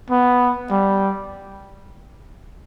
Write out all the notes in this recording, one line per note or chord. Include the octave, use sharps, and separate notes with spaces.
B3
G3